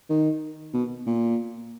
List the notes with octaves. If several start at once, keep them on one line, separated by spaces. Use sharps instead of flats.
D#3
B2
A#2